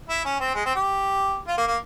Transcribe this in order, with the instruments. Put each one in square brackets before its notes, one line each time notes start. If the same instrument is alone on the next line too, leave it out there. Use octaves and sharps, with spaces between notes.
[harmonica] E4
C#4
C4
G#3
C4
G4
F4
A#3
A#3